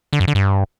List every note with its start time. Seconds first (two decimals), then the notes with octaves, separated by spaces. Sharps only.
0.13 D3
0.20 F#2
0.28 D3
0.35 G2